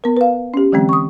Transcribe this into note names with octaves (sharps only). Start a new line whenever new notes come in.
B3 A#4
B4 F5
C#4 G4
D3 E3 F#3 G#3 C4
C#6 D#6